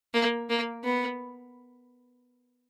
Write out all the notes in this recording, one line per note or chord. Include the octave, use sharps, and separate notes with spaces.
A#3
A#3
B3